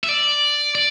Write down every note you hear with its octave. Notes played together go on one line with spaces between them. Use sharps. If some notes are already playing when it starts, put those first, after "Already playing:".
E5
D5
D5